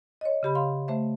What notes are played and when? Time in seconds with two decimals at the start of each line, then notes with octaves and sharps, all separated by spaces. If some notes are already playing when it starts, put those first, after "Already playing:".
0.21 C#5 D#5
0.43 C#3 G4 B5
0.55 F5 C6
0.88 A3 C5 E5